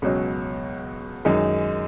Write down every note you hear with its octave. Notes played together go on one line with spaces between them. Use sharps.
C#2 B2 F#3 C#4
F#2 D#3 G#3 D#4